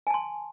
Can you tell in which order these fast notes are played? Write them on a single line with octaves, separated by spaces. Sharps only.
G#5 A5 C6